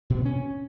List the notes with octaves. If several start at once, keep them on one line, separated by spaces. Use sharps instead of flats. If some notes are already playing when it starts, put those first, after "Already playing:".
B2
B3
C#4